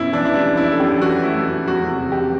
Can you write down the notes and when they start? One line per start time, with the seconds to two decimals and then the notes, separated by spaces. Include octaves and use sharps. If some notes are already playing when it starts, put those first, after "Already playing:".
Already playing: F#2 B2 E4
0.13 E3 D4
0.25 E4
0.35 G3 D4
0.57 F#2 E4
0.72 A4
0.79 F#2 G4
1.02 E3 F#4
1.23 A3 E4
1.46 F#2
1.67 E2 F#4
1.90 C3
2.12 E3 G4